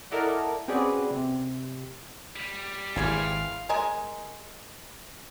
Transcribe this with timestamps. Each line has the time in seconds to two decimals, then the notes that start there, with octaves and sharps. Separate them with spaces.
0.11 E4 A4 A#4 D5 D#5 F#5
0.68 C4 C#4 F#4 G#4 B4 D5
1.11 C3
2.36 G3
2.96 G#1 E3 G#4 F5 G#5 C6
3.69 G#3 A#4 D#5 G#5